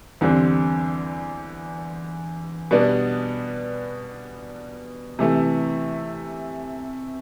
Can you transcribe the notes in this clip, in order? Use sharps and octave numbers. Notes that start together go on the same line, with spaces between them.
E2 D3 G3 C4
B2 G3 B3 D4
C3 E3 A3